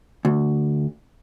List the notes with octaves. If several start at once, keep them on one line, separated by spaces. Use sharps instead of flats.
D2